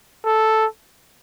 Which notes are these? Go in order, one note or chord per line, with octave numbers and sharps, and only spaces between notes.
A4